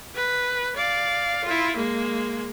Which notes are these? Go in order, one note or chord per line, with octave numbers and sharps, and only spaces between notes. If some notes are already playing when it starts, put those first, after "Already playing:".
B4
D5 F5
E4 F4
G#3 A#3